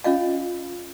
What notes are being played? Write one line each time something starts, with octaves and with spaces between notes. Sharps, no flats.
C#4 F4 D#5 F5